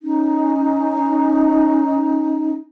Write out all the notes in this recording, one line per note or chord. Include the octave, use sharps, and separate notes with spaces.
C#4 D#4